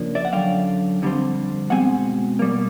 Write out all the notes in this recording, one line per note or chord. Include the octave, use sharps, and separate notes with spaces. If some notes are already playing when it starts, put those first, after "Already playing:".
Already playing: C#3 F3 A#3 D4
D5 E5
F#5
F#2 D3 F#3 F5 G5
F2 D3 G3 C4
B2 G#3 C4 F#5 G#5
B2 G3 A#3